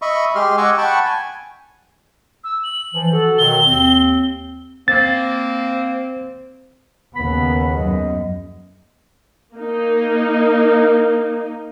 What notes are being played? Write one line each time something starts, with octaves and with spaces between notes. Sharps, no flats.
D#5 E5 B5 C#6
G#3 G4 C6 F6
D#5 F#5 G#5 C#6 D6 E6
F#5 G5 A5 B5 C#6
G#5
E6
F#7
E3 F3
F#4 A4
B2 D#3 F#3 G7
D#2 C4
A#3 C4 A6
D#2 C#3 B3 B5
F#2 D#5
A#3 D#4